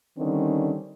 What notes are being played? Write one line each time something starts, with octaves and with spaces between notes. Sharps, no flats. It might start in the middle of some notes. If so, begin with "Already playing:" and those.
D3 D#3 G3 C4 C#4